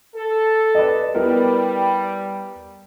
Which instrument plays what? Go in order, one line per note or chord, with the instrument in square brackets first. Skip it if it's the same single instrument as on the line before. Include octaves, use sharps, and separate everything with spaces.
[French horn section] A4
[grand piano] B4 D5 D#5
[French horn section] G3 [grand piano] B3 E4 A#4